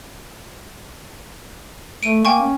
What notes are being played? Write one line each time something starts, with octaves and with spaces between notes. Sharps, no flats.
A3 D7 D#7
A#3 G5 G#5 C#6
C#4